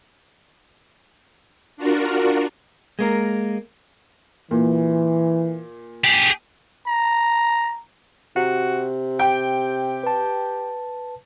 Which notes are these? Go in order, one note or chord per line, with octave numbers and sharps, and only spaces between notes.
D4 F4 F#4 A#4
G#3 A#3 A#4
A#2 E3
G4 G#4
A#5
C3 F#4
G4 G5
B4 A5